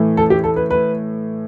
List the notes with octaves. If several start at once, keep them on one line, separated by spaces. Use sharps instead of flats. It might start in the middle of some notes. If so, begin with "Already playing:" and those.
Already playing: A2 E3 A3
A4
G4
A4
B4
B4